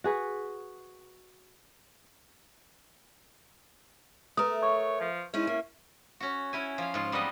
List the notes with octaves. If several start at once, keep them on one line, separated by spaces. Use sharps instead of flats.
F#4 G#4 B4
A3 A#4 B4 D#6
C#5 C#6
F3
G#3 C#4 D#4 E4
A#3
C#4 F#4
C#4 E4 G#5
F3 F5
G#2 F4
G3 B3 C4 D#4 D#5